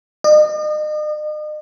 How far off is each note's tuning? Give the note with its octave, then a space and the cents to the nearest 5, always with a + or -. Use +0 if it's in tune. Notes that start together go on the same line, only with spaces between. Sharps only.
D#5 -40